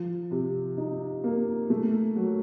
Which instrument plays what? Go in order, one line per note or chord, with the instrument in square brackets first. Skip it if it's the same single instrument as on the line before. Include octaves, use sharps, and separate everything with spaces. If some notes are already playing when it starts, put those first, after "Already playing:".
Already playing: [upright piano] F3
C3
D#4
A#3
A3
F#3